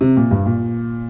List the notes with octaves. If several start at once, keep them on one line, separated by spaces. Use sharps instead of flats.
C3
A#2
G2
A#2